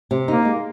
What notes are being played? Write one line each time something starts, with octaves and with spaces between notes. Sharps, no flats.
C3
A#3 D#4
G#3